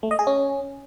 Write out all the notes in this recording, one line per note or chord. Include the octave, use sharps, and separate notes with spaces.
A3
D#5
G#4
C#4